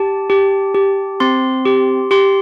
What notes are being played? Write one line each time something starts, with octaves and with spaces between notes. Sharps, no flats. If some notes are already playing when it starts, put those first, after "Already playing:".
Already playing: G4 A5
G4
G4
C4 C6
G4
G4 C6